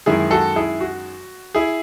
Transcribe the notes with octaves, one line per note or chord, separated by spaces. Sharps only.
F#2 D#3 G#3 E4 G#4
F#4 A4
E4 G#4
F#4
E4 G#4